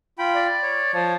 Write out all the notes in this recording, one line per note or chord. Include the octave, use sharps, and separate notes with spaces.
F4 G5 B5
D5
C#5
F3